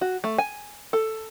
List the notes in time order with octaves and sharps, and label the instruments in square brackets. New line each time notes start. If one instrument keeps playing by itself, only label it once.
[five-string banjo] F#4
A3
G#5
A4